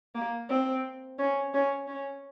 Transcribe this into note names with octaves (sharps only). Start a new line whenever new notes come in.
A#3
C4
C#4
C#4
C#4